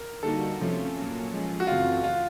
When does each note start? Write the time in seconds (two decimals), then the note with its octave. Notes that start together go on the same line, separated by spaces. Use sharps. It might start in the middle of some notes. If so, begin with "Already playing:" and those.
Already playing: A#4
0.23 D3 G3 A#3 D#4 F#4 A4
0.59 C3 F3 A3 C#4 F4
0.96 A#2 F#3 A#3 C#4
1.31 F3 G#3 C#4 F4 G#4
1.60 F#4
1.67 F#2 C#3 E3 A3 C4 F4
2.04 F4